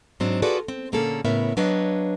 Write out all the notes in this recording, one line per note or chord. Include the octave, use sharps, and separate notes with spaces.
G#2 F#3 C4 D4
F4 F#4 G#4 A4 B4 D5
C4
A#2 D3 A#3 C#4 G#4 A4
A2 C#3 B3 A#4 E5
F#3 D4 B4 C#5 D#5 F5